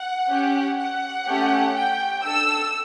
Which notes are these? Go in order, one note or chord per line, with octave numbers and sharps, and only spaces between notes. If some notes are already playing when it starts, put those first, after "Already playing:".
Already playing: F#5
C#4 G4
F#5
A3 C#4 G4
G5
D4 A4 E6